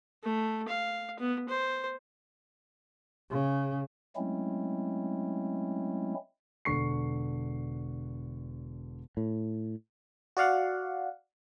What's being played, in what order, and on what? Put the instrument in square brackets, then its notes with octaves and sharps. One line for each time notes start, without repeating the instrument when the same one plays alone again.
[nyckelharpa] A3
F5
B3
C5
[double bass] C#3
[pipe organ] F#3 G#3 A3 C4 C#4 E4
[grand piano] E1 D3 C#6 C7
[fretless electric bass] A2
[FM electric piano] F#4 D5 F5 F#5